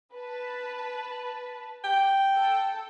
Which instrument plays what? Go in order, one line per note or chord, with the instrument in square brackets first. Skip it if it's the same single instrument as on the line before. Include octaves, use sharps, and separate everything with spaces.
[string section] B4 A5
[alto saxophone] G5
[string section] A4